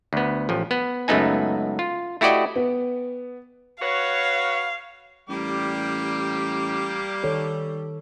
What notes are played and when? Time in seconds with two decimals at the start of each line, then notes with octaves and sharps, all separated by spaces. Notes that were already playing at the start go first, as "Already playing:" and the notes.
0.13 D2 B3
0.49 A1 F3
0.71 B3
1.08 C#2 F#2 A3 B3 D#4 G#5
1.79 F4
2.21 A3 E4 F#4 G4 D5 D#5
2.56 B3
3.82 F#4 B4 C#5 F5
5.29 A1 G3 A#3 G4 D6
7.24 D#3 A4 C#5